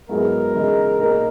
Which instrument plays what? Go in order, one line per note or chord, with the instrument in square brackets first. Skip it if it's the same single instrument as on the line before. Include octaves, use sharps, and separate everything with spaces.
[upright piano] G#2 F#3 B3 E4 G#4 [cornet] A#4
[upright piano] C#3 E3 G#3 D#4
A#2 A#3 D#4 G#4